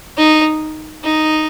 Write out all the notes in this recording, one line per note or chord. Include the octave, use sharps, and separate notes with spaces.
D#4
D#4